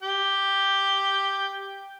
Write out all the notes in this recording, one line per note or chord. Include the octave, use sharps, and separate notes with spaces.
G4 G5